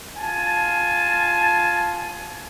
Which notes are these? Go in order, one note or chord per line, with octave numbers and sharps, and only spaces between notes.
F4 G#5 A5